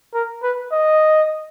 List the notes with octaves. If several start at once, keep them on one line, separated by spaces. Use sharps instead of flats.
A#4
B4
D#5